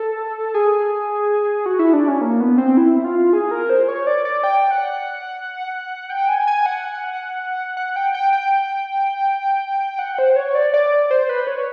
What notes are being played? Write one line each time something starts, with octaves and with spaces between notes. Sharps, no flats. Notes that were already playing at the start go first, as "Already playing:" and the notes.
Already playing: A4
G#4
F#4
E4
D4
C#4
A#3
B3
C4
E4
F4
G#4
A#4
C5
C#5
D5
D5
G5
F#5
G5
G#5
G#5
F#5
F#5
G5
G5
G5
F#5
C5
C#5
D5
D5
C5
B4
C#5